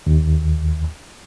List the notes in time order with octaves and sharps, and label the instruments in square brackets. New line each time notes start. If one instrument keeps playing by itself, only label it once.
[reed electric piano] D#2